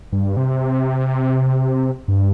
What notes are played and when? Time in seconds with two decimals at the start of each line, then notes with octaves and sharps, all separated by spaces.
0.12 G2
0.37 C3
2.08 G2